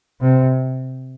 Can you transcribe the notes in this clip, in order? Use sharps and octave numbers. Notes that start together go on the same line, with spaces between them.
C3